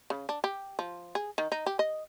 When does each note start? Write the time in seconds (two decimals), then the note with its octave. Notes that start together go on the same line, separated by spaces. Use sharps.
0.10 C#3
0.29 D4
0.44 G4
0.79 F3
1.15 G#4
1.38 D#3
1.52 D#4
1.66 G4
1.79 D#5